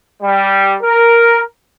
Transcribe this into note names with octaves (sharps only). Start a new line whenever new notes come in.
G3
A#4